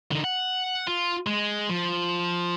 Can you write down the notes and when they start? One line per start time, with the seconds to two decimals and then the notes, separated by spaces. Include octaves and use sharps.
0.11 D3 D#4
0.24 F#5
0.87 F4
1.27 G#3
1.69 F3